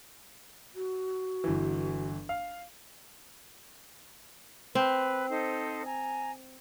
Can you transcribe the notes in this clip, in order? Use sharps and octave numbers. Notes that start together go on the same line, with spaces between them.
F#4
G1 E3
F5
C4 B4
D#4 A4 C5
G#5 A#5